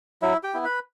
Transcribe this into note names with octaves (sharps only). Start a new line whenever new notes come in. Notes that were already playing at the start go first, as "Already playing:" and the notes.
F#3 E4 E5
G4 G5
B3 E4
B4 B5